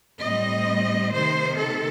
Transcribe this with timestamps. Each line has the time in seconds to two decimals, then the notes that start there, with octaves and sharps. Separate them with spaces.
0.22 A2 G3 C4 D#5
1.13 C3 D#3 A3 C5
1.58 A4